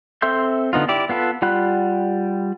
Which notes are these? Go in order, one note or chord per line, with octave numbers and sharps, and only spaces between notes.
C4 A4 E5 C6 G6
D3 B3 D#4 F4
E4 G4 D5
B3 F4 A4 B4
G3 F4 F#5 B5 F#6